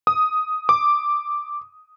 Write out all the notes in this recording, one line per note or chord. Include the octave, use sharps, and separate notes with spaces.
D#6
D6